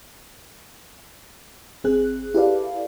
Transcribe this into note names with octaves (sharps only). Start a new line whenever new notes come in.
G#1 C4 G#4 F#6
E4 G4 A4 B4 D5 F5